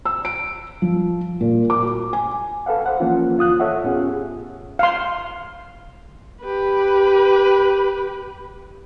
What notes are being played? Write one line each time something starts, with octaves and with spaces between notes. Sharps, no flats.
E6
D7
F3
A#2
D6
F#4
G#5
A4 B4 F5 F#5
C5 F#5
E3 F3 A#3 C#4 F4
D2 F4 D#6 F#6
A4 C#5 E5 F#5
A2 B3 C#4 F4 G4 G#4
F5 C6
G4 B4